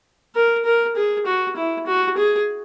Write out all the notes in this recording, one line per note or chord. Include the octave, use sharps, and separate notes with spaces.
A#4
A#4
G#4
F#4
E4
F#4
G#4